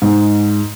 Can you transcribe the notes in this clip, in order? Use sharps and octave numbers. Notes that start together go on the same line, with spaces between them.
G#2